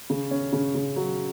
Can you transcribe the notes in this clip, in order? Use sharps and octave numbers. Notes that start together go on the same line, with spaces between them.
C#3
C#4
C#3
C#3
F#3